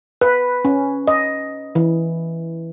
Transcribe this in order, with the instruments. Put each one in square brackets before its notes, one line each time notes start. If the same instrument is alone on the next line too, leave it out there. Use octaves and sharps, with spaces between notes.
[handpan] B4
C#4
D#5
E3